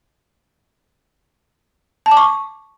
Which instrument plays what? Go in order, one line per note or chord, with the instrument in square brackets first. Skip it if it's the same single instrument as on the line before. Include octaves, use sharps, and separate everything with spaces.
[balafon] A5
D6
C#6